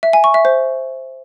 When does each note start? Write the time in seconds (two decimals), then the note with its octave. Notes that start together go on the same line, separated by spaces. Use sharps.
0.03 E5
0.13 G#5
0.24 C#6
0.34 E5
0.45 C5